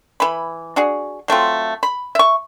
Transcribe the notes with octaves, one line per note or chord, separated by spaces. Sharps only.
E3 B5
D4 F#4 G#4
F#3 A3 C4 F4
B5
E5 C#6